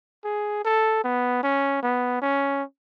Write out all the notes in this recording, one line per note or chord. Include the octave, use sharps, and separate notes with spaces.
G#4
A4
B3
C#4
B3
C#4